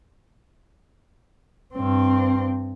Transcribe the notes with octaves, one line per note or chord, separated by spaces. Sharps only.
G2 C4